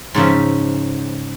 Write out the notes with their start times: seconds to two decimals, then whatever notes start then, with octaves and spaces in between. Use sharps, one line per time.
0.14 G#2 C#3 F3 E5